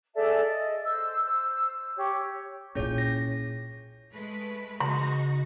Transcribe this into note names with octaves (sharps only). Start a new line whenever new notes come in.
G#4 A4 D5 E5
D#5
C5 E6
C5 E6
G4 C#5
A#2 C#4 E4 G#4 C#5
A#6
G#3 A3 B4
C#3 D#4 F#4 C6